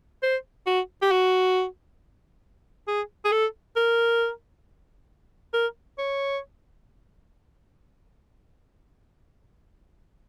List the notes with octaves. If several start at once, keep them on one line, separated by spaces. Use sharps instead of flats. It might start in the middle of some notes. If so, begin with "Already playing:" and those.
C5
F#4
G4
F#4
G#4
G#4
A4
A#4
A#4
C#5